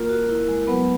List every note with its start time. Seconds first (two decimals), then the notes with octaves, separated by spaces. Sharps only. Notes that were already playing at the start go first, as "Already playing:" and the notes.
Already playing: A#3 F4 A#4
0.09 F#4
0.29 E4
0.48 G#3
0.67 F#3 B3 B4